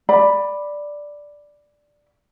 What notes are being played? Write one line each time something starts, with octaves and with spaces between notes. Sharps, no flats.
D5 B5